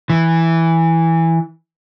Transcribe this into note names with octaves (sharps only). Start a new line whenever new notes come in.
E3